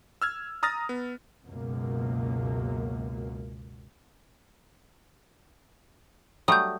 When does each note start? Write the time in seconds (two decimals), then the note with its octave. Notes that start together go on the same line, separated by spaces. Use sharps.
0.22 E6 F6 G#6
0.63 A#5 D#6 F6 A6 A#6
0.89 B3
1.44 C#2 F#2 B2 A#3
6.48 F#3 G3 A3 D#6 G6